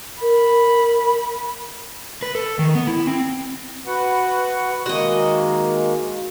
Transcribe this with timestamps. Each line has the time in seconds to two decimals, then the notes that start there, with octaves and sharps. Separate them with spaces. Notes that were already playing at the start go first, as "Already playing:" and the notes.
0.21 A#4 B5
2.22 B4
2.35 A4
2.59 D#3
2.75 B3
2.87 E4
3.07 C4
3.86 F#4 B4 F#5
4.86 D#3 G#3 A#3 F#4 D#5